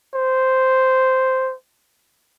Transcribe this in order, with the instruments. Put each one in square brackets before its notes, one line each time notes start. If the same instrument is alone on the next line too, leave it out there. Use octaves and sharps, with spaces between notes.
[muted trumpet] C5